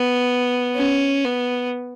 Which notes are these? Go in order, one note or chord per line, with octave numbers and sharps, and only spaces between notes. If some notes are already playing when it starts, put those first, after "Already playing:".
Already playing: B3
C#4
B3